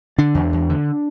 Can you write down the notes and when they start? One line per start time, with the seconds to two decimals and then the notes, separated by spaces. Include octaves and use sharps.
0.18 D3 D4
0.35 E2
0.53 E2
0.70 D3